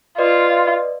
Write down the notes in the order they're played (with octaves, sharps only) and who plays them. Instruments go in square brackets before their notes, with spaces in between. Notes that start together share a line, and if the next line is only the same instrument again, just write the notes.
[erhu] F4 [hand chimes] B4 D5 D#5